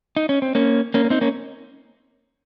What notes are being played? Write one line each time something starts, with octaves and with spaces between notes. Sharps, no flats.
D#4
C#4
C4
A#3 C#4
A#3 C#4
C#4
C4 D#4
A#3 C#4